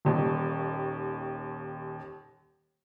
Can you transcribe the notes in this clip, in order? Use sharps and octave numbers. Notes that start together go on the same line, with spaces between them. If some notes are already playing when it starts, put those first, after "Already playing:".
D#1 D#2